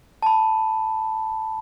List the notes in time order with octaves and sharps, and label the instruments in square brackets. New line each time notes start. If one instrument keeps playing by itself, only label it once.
[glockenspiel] A5 B5